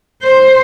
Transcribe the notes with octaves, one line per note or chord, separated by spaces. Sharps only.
C5